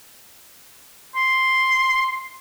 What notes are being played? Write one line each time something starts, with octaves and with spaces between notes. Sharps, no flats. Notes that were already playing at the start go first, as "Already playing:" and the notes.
C6